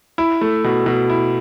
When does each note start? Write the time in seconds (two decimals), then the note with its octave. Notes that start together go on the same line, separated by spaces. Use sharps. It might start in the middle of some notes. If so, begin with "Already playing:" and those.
0.18 E4
0.41 A3
0.64 B2
0.86 B2
1.10 E4